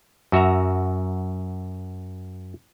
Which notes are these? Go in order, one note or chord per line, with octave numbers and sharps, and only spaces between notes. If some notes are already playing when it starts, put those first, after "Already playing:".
F#2 F#4 E5 A#5